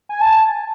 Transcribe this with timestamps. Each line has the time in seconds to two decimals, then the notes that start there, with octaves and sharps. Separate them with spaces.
0.09 G#5
0.20 A5